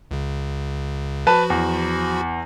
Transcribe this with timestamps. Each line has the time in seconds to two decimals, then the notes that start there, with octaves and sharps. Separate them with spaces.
0.11 C#2 C#3
1.27 F3 F#4 B4 A5 B5
1.50 E2